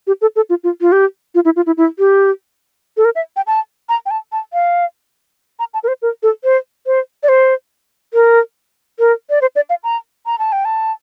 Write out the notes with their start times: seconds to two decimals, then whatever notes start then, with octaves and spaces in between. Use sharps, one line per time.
0.07 G4
0.21 A4
0.36 A4
0.50 F4
0.64 F4
0.81 F4
0.92 G4
1.35 F4
1.45 E4
1.56 F4
1.66 E4
1.77 E4
1.99 G4
2.97 A4
3.05 A#4
3.15 E5
3.36 G5
3.47 A5
3.89 A#5
4.06 G5
4.11 A5
4.32 A5
4.53 F5
5.59 A#5
5.74 A5
5.84 A#4
5.88 C5
6.02 A#4
6.23 A4
6.44 C5
6.86 C5
7.23 D5
7.29 C5
8.14 A#4
8.99 A#4
9.30 D5
9.41 C5
9.56 D5
9.70 F5
9.84 A#5
10.26 A#5
10.39 A5
10.52 G5
10.65 A5